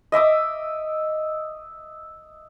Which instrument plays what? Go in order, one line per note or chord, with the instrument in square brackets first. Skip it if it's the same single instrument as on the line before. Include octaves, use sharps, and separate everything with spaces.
[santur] D#5 E5 D6 D#6